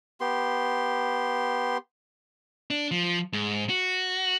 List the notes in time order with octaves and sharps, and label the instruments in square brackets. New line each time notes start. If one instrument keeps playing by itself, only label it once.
[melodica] B3 G4 C6
[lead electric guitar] D4
F3
G#2
F#4